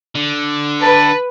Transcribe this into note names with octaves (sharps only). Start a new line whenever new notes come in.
D3
B4 A5